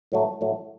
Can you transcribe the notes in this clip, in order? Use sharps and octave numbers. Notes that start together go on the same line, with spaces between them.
A2 F#3 A3
A2 F#3 A3